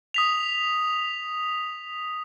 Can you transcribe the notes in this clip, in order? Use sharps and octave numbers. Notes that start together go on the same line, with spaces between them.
D#6 B6 F7